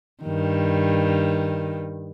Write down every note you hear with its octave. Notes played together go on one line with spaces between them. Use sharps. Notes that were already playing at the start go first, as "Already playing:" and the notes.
G2 D#3